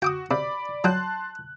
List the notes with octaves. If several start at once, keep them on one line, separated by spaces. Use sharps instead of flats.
F#4 G5 D6 D#6
C3 D5 B5 D6
F#3 G5 A5 C6 F#6